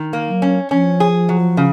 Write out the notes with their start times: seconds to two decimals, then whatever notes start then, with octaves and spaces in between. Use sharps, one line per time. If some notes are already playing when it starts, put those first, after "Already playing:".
Already playing: D#3
0.13 A#3
0.28 F#3
0.42 C#4
0.71 F3 C#4
1.00 G#4
1.29 F#3
1.57 C#3